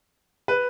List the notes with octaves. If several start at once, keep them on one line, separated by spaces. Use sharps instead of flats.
B4